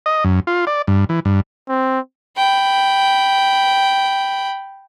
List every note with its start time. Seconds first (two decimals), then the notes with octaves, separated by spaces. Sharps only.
0.06 D#5
0.24 F#2
0.47 F4
0.67 D5
0.87 G2
1.09 E3
1.25 G2
1.68 C4
2.37 G5 B5